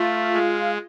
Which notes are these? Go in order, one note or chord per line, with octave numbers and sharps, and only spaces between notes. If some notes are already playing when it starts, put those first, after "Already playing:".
Already playing: A3 F4
G#3